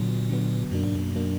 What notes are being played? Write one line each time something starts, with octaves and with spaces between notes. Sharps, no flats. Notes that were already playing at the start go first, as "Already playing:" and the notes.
Already playing: A#2 D3 F#3 B3
D3 F#3 B3
F#2 B2 F#3 A#3 D4
G#2
F#2
B2 F#3 A#3 D4